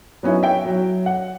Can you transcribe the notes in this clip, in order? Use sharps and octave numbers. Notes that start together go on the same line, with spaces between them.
F#3 B3 C#4 D#4 E4
E5 G5
F#3
F#5